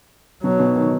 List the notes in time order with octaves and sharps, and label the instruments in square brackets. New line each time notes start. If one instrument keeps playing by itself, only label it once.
[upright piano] B2 [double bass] F#3
[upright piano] B2
D#3